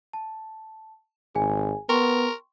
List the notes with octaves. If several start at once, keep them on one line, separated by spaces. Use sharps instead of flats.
A5
G#1 G#4 G#5
B3 A#4 G5 C6 C#6